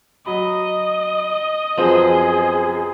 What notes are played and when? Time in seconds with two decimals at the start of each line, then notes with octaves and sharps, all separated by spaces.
0.26 F#3 D#5 B5
1.78 F#2 F3 B3 C4 G#4